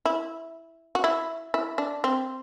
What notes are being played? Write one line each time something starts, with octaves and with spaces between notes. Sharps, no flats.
E4
F#4
E4
E4
D4
C4